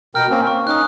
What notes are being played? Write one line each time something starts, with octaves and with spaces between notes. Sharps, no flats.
B2 A#4 G5 F6
A#3 C4 C#4
A#3 C#6
C#4 D#4 D#6 F#6